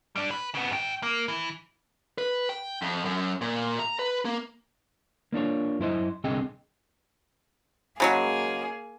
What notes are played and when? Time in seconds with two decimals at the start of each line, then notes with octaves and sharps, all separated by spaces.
0.16 G3 D4
0.31 B4
0.55 C#3 B3
0.71 G#2 G5
1.03 A#3
1.28 E3
2.18 B4
2.49 G5
2.82 F2
3.05 F#2
3.41 A#2
3.80 A#5
3.99 B4
4.25 A#3
5.33 A#3 D4 F4 C#5
5.79 F#2 E4 C5 D#5
6.24 C2 D3 C4 G#4 D#5 G5
8.00 C#3 F#3 G#3 A#3 G#4